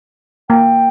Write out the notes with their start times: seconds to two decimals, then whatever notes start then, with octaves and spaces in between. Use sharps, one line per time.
0.50 A#3 G5